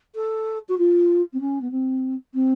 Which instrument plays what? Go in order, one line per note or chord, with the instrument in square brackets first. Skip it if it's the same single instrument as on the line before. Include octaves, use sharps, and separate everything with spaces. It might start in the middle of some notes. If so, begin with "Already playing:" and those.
[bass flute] A4
F#4
F4
C4
C#4
B3
C4
C4